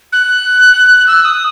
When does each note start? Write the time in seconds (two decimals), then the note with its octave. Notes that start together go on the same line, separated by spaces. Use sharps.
0.12 F#6
1.07 E6
1.25 D#6